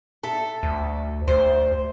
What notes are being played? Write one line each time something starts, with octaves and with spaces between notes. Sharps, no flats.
A4 E5
D2
D2 C5